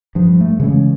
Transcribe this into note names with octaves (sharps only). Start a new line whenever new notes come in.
G2 F3
A3
C#3 E3 G#3 C#4